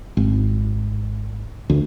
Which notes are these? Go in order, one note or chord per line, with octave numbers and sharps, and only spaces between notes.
G#1
D2